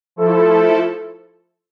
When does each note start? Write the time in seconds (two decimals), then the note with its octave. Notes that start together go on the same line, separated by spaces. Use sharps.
0.16 F3 A3 E4 A4